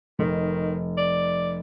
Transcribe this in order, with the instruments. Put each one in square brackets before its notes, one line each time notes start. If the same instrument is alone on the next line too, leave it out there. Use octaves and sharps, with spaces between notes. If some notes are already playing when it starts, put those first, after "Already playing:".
[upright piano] F1 [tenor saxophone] D#3
[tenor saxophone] D5